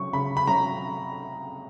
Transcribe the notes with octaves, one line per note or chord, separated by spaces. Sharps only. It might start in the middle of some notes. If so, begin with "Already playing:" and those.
Already playing: C#3 F#3 C#4 C#6
C#3 B5
B5
F#3 C#4 A#5